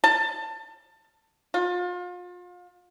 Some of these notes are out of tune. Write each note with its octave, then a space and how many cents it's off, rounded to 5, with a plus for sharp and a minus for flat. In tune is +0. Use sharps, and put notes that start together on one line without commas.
A5 +20
F4 +35